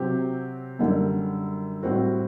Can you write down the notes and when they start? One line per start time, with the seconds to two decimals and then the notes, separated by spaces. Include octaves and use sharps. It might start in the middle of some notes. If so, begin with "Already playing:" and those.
Already playing: C3 F#3 C4 G4
0.79 F#2 D3 G3
1.83 A2 G3 C4 F#4